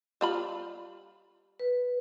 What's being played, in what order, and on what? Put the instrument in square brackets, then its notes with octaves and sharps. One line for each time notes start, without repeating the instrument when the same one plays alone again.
[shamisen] G3 F4 B5
[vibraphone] B4